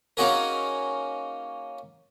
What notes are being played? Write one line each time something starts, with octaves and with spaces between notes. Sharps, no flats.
A#3 C#4 D#4 F#4 G#4 A#4